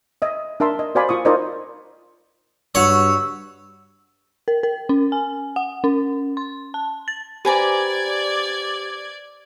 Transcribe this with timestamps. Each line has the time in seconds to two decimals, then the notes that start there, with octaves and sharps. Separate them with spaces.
0.22 D#5 E5
0.60 D4 A#4 E5 A5 C6
0.79 D#5
0.95 F#4 C5 D5 F5 G#5 B5
1.09 F4 C#6 D#6
1.25 D#4 F4 A#4 C5 D5 D#5
2.75 G2 G3 F#4 C#5 E6
4.48 A#4
4.63 A#4
4.89 C#4
5.12 G#5
5.56 F#5
5.84 C#4
6.37 C6
6.74 A5
7.08 A6
7.45 G4 B4 C5 D5 G#5 A#5 G#6